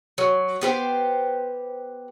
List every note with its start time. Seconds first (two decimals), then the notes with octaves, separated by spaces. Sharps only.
0.18 F#3
0.61 B3 G4 C5